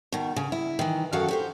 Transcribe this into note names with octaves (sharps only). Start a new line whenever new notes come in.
B2 D#3
C#3
E4
D#3 E3
F#2 D#3 F#4 A4 F5
F#4 G4 C5